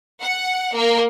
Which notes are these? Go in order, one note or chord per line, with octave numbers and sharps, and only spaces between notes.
F#5
A#3